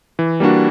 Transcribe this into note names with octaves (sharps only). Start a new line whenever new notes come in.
E3
G3 A#3 D4 F#4